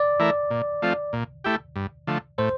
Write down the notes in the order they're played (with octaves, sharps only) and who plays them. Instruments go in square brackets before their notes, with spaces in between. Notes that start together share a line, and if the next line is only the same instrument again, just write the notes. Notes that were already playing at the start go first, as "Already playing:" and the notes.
Already playing: [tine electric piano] D5
[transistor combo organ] E3 A3 E4 A#4
A#2
F3 A3 C4 F4
A#2
A3 E4 G4
G2
D3 F3 A3
[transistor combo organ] A2 [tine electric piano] C5